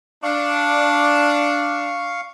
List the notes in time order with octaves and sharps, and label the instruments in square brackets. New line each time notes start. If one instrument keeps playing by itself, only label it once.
[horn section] D4 [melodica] F5 C#6